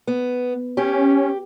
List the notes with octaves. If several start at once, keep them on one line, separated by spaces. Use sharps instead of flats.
B3
C#4 G4